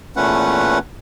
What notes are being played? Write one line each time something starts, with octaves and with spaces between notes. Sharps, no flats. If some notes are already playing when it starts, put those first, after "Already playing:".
E2 A#2 A3 C#4 B4 F#5